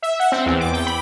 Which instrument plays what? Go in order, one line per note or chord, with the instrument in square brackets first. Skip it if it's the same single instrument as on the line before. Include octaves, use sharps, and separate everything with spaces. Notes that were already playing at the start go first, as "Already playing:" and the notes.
[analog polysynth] E5
F#5
C4
E2
D6
G5
B5